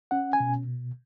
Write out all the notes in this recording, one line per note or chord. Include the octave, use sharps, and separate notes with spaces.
C#4 F#5
G#5
B2